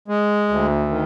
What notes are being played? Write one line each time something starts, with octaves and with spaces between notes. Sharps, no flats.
G#3
D2
D#3